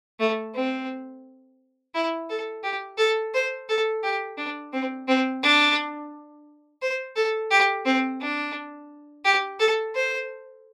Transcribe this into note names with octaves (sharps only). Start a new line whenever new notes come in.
A3
C4
E4
A4
G4
A4
C5
A4
G4
D4
C4
C4
D4
C5
A4
G4
C4
D4
G4
A4
C5